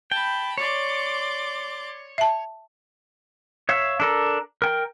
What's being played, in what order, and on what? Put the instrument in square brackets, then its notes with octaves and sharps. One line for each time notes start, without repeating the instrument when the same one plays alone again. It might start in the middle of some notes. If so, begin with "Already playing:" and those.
[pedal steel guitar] G5 [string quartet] A5 B5
[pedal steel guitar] C#5 [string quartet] D5 C6 D6
[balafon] E5 A5
[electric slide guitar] C#5 E5 F5
D4 A4 A#4
A#4 G5